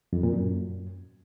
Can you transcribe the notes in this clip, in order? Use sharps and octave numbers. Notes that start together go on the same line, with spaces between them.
F2
A#2
F#2